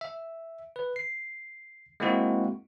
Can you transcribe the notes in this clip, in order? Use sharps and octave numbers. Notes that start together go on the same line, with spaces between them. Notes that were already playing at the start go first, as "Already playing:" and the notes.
E5
B4
C7
G#3 A#3 C4 E4 F#4